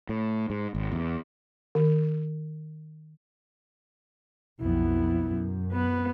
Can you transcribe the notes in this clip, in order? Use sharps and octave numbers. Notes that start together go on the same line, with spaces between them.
A2
G#2
G#1
E2
D#3
B1 F2 B3 E4
F#2
B3 B4